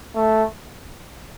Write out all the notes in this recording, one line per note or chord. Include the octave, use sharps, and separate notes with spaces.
A3